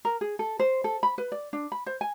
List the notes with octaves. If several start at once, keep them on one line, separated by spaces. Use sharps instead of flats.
A#4
G#4
A4
C5
A4
B5
B4
D5
D4
B5
C5
G#5